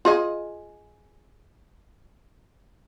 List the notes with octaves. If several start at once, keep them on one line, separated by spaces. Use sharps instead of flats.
F4 G#4 D#5